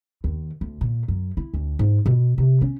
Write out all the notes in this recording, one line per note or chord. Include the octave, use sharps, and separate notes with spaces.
D#2
D2
A#2
F#2
E4
D2
G#2
B2
C3
C#4